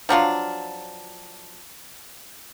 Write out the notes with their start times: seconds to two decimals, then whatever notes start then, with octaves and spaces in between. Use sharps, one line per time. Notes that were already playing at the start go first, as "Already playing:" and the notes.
0.09 F3 F#3 D4 F4